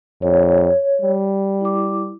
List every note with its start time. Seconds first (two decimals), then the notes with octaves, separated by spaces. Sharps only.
0.22 F2 C#5
1.00 G3
1.61 E4 D6